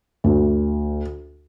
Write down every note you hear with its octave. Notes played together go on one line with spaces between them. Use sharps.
D2